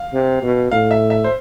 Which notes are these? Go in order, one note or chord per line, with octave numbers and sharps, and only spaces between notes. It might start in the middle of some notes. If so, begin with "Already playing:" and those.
Already playing: F5
C3
B2
A2 F5
E5
E5
C5